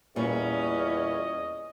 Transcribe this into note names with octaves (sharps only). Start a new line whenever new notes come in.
E2 A#2 G3 C#4 D#5